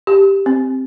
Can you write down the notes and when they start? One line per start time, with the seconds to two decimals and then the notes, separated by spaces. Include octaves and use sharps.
0.07 G4
0.46 C4